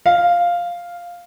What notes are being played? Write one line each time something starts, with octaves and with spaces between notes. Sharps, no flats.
F5